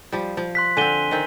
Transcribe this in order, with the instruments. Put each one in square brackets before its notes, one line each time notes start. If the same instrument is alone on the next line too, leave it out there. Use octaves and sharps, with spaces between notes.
[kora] F3 G3
F3
[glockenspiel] C6 F#6 B6
[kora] D3 C4 [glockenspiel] G#5 D#7 G7
[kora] D#3 C4